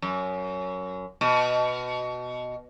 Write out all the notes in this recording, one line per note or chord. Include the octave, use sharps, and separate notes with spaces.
F#2
B2